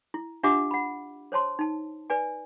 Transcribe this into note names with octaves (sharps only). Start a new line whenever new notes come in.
E4
D4 F4 G4 E5 F#5 D6
F#5 B5
C5 C#5 A5 C6
D#4 A5
B4 D5 G#5